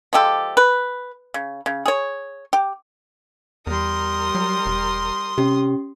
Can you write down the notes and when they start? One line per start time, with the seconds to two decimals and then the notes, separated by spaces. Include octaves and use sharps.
0.13 F3 G#3 G4 A4
0.57 B4
1.34 C#3
1.66 C#3
1.86 G#4 C#5
2.53 G4
3.67 E2 G3 A#4 C6 D#6
4.35 F#3
4.66 E1
5.38 C3 C#4 G4